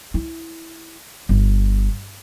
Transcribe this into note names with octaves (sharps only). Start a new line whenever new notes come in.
E4
G1